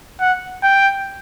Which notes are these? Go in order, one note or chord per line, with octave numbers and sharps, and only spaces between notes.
F#5
G5